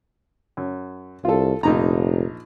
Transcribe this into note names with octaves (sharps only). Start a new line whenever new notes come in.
F#2
C2 F4 A4
F1 A#1 D#4 A#5